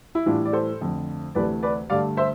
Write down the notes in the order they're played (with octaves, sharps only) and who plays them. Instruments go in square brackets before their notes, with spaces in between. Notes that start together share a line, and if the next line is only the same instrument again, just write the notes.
[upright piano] E4
A2 E3 G3 D4 F4
D5
A4 C5
F2 D3 A3
D2 C3 E3 A3 B4 D5
B4 D5
G2 D3 A3 D5 F5
C5 E5